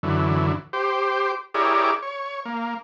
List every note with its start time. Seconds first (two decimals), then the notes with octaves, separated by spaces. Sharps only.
0.03 F#2 D3 E3
0.73 G4 C5
1.54 E4 G4 G#4 A#4 C#5 D5
2.03 C#5
2.45 A#3